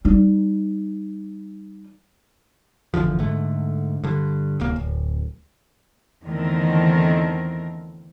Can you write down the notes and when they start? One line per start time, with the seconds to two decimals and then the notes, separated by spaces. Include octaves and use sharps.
0.05 G3 D#4
2.94 F#1 E2 D3 F3
3.19 G#2 D3 A3
4.04 G2 D3
4.60 D1 C2 A#3
4.76 D1
6.25 E2 D3 D#3 A3 C4 A#4